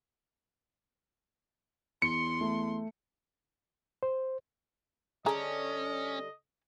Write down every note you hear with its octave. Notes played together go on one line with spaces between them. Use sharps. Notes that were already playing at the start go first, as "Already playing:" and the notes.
E2 C6 C#7
A3
C5
D3 G3 C#4 G#4 D#5 A#5